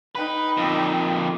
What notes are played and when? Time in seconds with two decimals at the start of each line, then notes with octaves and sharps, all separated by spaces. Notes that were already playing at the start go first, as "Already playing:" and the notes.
0.15 D#4 B4 G5
0.58 F2 A#2